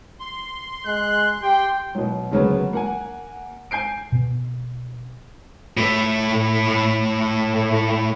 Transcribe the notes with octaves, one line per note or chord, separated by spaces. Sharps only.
C6
G#3 F#6
G4 G5
B2 F#3
D2 C#3 F#3 A#3 B3 C#4
A#3 F#5 G#5
G#5 G6 C7 D7
B2 B3
A2 A3